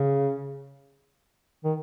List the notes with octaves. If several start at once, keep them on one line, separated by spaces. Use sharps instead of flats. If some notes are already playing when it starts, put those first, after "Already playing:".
Already playing: C#3
D#3